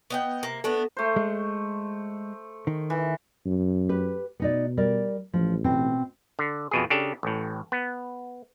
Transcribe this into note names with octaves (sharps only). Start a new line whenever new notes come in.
B3 D#5 G5
C3 A#3
A3 B3 D4 A4
A3 C5
G#3
D#3
E3
F#2
G4 B4
B2 B3 D#4 D5
G3 A#4 D5
A1 F3
B2 C4 G5
D3
F2 B2 G#4
C#3 D4 G4 A4
A1 A2
B3